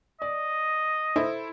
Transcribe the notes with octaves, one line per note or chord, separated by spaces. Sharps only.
D5 D#5
E4 A4 C5